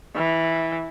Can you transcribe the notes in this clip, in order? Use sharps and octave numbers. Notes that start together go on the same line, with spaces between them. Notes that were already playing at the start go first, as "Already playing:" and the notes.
E3